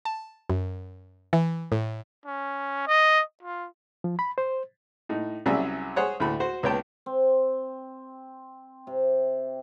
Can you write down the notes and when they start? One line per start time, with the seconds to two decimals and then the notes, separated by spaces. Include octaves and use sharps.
0.05 A5
0.50 F#2
1.33 E3
1.72 A2
2.26 C#4
2.87 D#5
3.43 F4
4.04 F3
4.19 B5
4.38 C5
5.09 A2 D#4
5.46 C2 F#3 C#4 G#4 D5 E5
5.96 G#4 C5 C#5 F#5
6.20 D2 A2 B5
6.40 F#4 C5
6.63 C#2 B3 C#5 G5 A5
7.06 C4
8.87 C3